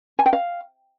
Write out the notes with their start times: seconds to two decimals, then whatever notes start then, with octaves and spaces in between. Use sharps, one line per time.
0.19 G#5
0.26 G5
0.33 F5